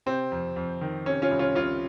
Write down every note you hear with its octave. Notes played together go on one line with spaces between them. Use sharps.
C3 C4
F2
F2
D#3
C3 C#4
C#4 F4
C2
C#4 F4
C2 C#4 F4